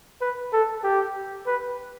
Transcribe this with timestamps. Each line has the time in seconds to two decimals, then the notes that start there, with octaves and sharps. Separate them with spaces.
0.21 B4
0.53 A4
0.84 G4
1.47 B4